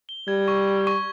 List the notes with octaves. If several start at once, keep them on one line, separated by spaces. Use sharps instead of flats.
G7
G3 G#6
C#6
C#6
C#6